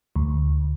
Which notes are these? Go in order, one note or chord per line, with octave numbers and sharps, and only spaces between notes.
D2